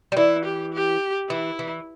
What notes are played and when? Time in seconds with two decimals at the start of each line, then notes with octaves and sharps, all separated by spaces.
0.12 G3
0.17 E3 E4
0.45 G4
0.74 G4
1.30 E3 E4
1.59 E3